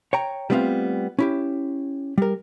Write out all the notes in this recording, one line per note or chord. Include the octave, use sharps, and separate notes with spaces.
C#5 G5 A#5
G3 A3 B3 C4 D#4 F4
C#4 E4 G4
G3 A#4